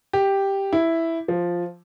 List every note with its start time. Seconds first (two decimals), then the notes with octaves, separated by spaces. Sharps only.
0.13 G4
0.73 E4
1.28 F3